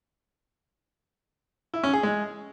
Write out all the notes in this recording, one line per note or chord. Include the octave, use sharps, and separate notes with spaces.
E4
C#4
G#4
G#3